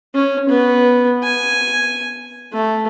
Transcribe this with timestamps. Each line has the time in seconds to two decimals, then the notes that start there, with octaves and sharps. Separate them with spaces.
0.15 C#4
0.49 B3
1.23 G#5
2.53 A3